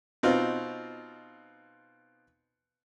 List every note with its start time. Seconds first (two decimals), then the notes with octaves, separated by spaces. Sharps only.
0.23 B2 C4 D#4 F4